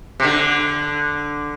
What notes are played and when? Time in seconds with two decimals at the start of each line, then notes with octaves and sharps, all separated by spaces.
0.20 C3
0.24 D3